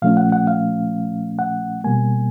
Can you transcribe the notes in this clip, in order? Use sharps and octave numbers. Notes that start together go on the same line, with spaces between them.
A#2 F3 A3 C#4 F5
F#5
F#5
F5
F#5
B2 G3 A#3 G#5